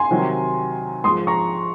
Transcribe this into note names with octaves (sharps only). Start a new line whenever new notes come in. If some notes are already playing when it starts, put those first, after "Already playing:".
Already playing: G#5 C6
C3 D#3 F#3
G#2 F3 G#3 C6 D#6
A#5 C#6